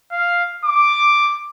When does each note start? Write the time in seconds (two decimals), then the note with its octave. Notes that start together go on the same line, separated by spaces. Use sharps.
0.12 F5
0.65 D6